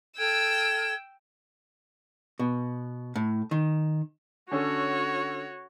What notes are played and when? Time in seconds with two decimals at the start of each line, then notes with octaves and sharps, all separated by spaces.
0.18 A4 G5 E6 F6 G#6
2.39 B2
3.16 A2
3.51 D#3
4.51 D3 C#4 F#4 A4 C#5